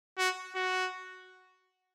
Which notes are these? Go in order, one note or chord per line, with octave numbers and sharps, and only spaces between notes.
F#4
F#4